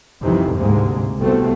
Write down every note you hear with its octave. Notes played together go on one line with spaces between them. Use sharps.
C2 F2 C3 D#3 E3
D2 G#2 C3 G#3 A#3
C2 B2 A3 C4